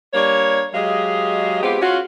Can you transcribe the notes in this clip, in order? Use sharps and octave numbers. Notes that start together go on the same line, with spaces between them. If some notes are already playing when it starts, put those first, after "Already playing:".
G3 A#3 D4 C#5
F#3 G#3 G4 G#4 D#5 F5
G#3 B3 C4 F4 G4
C#4 F4 F#4